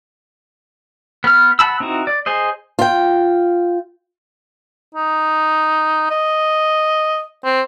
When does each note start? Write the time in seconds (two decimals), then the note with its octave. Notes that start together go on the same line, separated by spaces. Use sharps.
1.24 B3 B4 F6
1.59 F#5 A5 B5 E6
1.80 C4 D#4 E4 F#4
2.07 D5
2.26 G#4 C5 D#5
2.79 F4 G5
4.95 D#4
6.11 D#5
7.44 C4